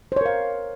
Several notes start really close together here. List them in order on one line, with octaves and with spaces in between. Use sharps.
C5 C#5 A#4 F5